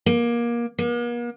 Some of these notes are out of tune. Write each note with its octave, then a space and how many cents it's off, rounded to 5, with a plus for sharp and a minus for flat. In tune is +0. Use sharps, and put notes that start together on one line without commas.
A#3 +25
A#3 +45